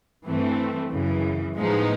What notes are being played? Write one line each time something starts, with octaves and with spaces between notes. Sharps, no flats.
G2 E3 A3 C4
F#2 C#3 E3
A2 F3 G#3 B3 D#4